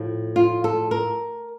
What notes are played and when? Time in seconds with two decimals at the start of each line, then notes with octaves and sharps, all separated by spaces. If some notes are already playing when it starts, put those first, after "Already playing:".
Already playing: A2 F3
0.36 F4
0.64 A4
0.91 A#4